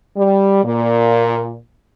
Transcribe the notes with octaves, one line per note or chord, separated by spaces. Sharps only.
G3
A#2